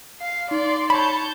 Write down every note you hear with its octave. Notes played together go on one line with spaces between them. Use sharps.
F5 C7
D#4 D5 C6
C#5 A5 B5 G6